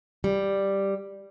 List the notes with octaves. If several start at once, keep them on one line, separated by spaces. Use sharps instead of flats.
G3